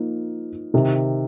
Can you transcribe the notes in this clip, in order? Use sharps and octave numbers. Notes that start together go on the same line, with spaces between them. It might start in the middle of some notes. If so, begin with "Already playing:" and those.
Already playing: F3 A#3 D#4
C3 D#3